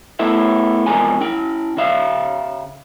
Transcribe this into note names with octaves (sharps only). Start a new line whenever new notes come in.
A3 B3 E4 E5
E2 C3 F3 G#3 A#4 G#5
C#4 E4 G5
C#3 E5 F5